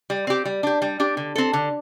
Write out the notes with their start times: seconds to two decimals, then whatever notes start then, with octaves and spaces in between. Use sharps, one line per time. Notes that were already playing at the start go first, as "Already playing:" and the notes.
0.10 G3
0.27 C4 G4
0.45 G3
0.63 D4 G4
0.82 G3
1.00 D4 G4
1.17 D3
1.35 C4 A4
1.53 D3